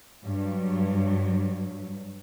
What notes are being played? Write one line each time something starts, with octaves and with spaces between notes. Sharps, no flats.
G2 F#3